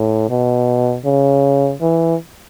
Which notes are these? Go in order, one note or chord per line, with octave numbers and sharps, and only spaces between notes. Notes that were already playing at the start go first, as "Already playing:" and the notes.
Already playing: A2
B2
C#3
E3